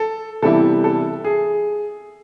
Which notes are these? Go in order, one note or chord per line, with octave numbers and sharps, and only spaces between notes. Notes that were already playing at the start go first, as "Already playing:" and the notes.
Already playing: A4
C3 E3 G3 B3 E4 A4
A4
G#4